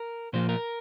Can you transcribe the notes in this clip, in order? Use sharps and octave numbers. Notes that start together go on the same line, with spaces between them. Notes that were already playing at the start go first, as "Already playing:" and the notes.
Already playing: A#4
A#2 F3 A#3 C5
A#4